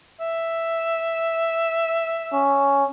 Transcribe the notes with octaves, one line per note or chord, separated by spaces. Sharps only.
E5
C#4